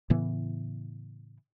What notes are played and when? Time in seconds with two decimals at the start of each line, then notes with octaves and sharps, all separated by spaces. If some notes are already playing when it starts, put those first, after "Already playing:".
0.10 A2 C#3 E3 B3